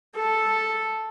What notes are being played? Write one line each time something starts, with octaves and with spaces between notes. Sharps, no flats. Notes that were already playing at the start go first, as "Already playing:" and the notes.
A4